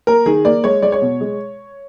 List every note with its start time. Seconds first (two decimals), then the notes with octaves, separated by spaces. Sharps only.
0.07 A#3 A#4
0.26 D#3 G#4
0.45 A#3 D5
0.64 G#3 C#5
0.82 G#3 D5
0.92 C#5
1.02 B2
1.21 G#3